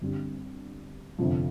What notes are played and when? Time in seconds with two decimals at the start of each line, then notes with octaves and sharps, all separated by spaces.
0.01 G1 G2 G3 C4 G4
1.18 G1 F2 C3 F3